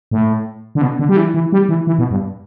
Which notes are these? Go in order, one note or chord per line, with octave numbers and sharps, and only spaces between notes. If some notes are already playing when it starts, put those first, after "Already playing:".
A2
D3
B2
D3
G3
E3
E3
G3
E3
E3
B2
G2